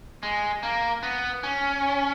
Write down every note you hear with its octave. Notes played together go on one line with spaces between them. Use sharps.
G#3
A#3
B3
C#4